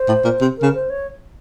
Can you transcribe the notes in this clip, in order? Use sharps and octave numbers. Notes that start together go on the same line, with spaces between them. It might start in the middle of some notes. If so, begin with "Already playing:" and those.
Already playing: C5
A2
A#2
C3
C#3 A#4
C5
C#5